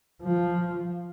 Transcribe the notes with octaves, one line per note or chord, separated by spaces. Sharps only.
F3